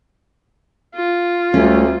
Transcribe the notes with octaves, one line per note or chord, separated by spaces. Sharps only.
F4
D2 G3 A3 C#4